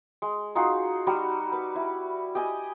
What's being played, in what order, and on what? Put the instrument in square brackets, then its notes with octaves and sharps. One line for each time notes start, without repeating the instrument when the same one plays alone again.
[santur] G#3
D#4 F4 F#4 G#4
G3 D#4 F#4
B4
E4
G4 D#5 G#5